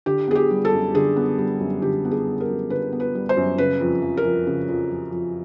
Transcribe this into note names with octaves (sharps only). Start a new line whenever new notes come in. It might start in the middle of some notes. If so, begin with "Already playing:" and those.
D3 G4
B3 G#4
G4
G3
A4
F#2
D3 G#4
B3
G3
F#2
D3 G4
B3
G#4
G3
A#4
F#2
D3 B4
B3
B4
G3
C5
F#2
C#3 B4
F2
F3
A#4
F2
C#3
F2
F3
F2